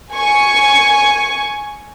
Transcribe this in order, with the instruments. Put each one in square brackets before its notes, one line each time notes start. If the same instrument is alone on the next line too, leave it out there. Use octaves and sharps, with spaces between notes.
[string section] G#5 C#6